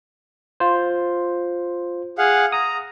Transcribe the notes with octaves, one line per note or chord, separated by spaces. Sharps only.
F4 C5
G#4 F5 F#5
A#5 D#6